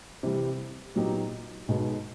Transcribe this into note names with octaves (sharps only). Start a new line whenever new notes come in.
C3 E3 G3
A#2 F#3 B3 D#4 G4
B1 B2 G#3 B3 D#4